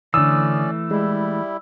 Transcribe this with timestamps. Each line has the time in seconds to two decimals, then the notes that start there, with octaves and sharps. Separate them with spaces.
0.14 D3 E3 A3 C#4 D5 D#6 E6
0.91 G3 G#3 E4